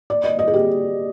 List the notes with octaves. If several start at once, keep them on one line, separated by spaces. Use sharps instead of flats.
D5
D#5
D#5
G#4
G4